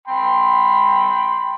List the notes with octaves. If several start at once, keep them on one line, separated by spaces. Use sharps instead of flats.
G5 B5 C6